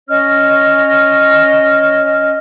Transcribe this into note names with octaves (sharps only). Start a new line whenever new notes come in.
C#4 C#5 D#5 F6